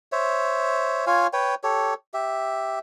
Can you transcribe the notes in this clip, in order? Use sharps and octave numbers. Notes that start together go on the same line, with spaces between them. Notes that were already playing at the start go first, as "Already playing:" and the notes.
C5 C#5 E5
F4 C#5 F5 G#5
B4 C#5 G5
G4 A4 C#5
G4 E5